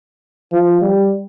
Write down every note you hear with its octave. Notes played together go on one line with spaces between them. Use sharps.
F3
G3